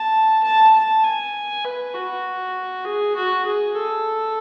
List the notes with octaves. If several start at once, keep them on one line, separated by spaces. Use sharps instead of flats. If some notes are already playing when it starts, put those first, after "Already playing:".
Already playing: A5
A5
A5
G#5
B4
F#4
G#4
F#4
G#4
A4